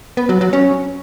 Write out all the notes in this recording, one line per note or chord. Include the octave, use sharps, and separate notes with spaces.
B3
F#3
F#3
C#4